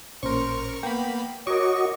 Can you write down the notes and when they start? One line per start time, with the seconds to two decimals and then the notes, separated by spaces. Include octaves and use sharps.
0.23 A1 A#2 C#4 A#4 C5 C#6
0.83 A#3 B3 G5 B5
1.47 F#4 A#4 C#5 D#5 C#6 D6